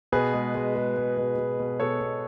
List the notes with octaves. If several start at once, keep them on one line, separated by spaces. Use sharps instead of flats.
B2 G#4 B4
G#3
G#3
G#3
G#3
B2
B2
B2
B2 A4 C#5
B2